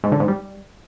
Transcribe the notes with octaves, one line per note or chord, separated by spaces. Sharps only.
G#2
D3
G#2
G3